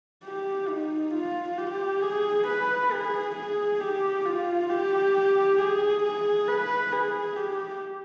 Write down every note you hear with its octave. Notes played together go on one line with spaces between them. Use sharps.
G4
D#4
F4
G4
G#4
B4
G#4
G#4
G4
F4
G4
G#4
G#4
B4
G#4
G4